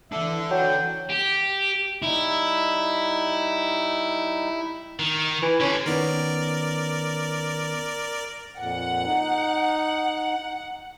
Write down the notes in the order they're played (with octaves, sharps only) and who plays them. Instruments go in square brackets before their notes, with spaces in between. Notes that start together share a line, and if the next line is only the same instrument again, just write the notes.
[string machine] E3 [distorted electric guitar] D4 A4 [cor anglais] E5
[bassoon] F#3 [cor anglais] G5
[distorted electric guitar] G4
[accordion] G3 D#4 [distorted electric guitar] E4
[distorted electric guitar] D#3
[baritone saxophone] E3
[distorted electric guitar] D3 G4 [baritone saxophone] C#4
[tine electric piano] D#3 B3 C#4 [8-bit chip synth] A#4 D5
[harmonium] F2 A#2 [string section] F#5
[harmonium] D#4